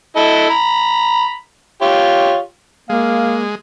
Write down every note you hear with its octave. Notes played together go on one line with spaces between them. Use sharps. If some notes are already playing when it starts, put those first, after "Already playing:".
E4 A4 D#5
A#5 B5
F4 G4 C#5
G#3 A#3 F5